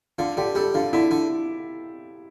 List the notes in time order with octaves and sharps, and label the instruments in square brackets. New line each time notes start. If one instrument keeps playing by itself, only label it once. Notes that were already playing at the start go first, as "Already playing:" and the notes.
[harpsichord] D3 [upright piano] F4
[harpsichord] D3 [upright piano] G4
[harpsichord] G3 [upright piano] A4
[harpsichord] D3 [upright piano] F4
[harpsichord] D3 [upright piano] E4
[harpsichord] D3